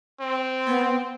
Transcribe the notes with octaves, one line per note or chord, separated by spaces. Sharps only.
C4
B3